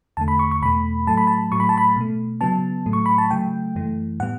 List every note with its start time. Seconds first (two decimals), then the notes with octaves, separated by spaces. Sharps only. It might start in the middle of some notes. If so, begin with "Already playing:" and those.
0.17 E2 D3 A3 A5
0.28 B5
0.39 C#6
0.51 C#6
0.62 E2 B2 A3 B5
1.07 A2 F#3 A3 A5
1.18 B5
1.27 A5
1.51 A2 F#3 A3 C#6
1.60 B5
1.69 A5
1.78 B5
1.96 B2 A3
2.41 C#3 F#3 B3 A5
2.86 A2 F#3 A3
2.93 C#6
3.06 B5
3.18 A5
3.31 C#3 F#3 A3 G5
3.75 F#2 E3 A3
4.20 A2 G3 B3 F#5